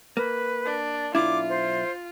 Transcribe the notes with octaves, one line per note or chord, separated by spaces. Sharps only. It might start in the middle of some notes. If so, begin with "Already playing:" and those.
A#3 B4
D4
B1 D4 E4 F4 D6
C5